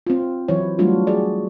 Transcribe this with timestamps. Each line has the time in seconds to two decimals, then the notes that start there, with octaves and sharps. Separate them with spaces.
0.07 C4 F4
0.48 E3 F#3 E4 C5 C#5
0.79 F#3 G3 A3 D4 F4 F#4
1.07 F#4 G#4 D5